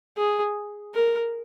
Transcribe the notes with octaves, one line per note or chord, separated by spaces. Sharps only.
G#4
A#4